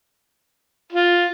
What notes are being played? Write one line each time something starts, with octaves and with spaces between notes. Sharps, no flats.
F4